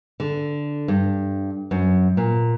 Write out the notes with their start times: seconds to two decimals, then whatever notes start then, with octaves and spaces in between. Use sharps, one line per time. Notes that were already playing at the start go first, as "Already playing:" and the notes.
0.20 D3
0.88 G2
1.71 F#2
2.17 A#2